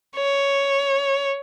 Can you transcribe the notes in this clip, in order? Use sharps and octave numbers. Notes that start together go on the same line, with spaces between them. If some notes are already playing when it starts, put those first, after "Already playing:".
C#5